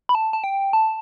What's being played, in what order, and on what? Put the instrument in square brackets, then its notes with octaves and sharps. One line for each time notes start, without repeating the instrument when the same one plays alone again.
[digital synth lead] B5
A5
A5
G5
A5